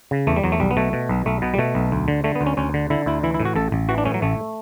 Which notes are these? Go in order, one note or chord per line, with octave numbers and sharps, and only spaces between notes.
C#3
E2 A3
G3
E2 F#3
A3
B1 G3
B3
B2 A3
B2
B1
B1 A3
B2 B3
G3
B2 A3
B1
D2
D3
D3 A3
B3
D2
C#4
D2 C#4
D3
D3 E4
D2 E4
E3 E4
E4
A2
F#4
A1 A4
A1
E3 F#4
D4
A2 C#4
F#3
A1 A3